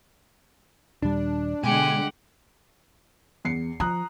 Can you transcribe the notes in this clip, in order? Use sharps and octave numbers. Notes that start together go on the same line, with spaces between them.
D#1 G3 D4
B2 D3 G#3 G4 F#5 G#5
E2 C7 C#7
F3 A#5 D#6 F#6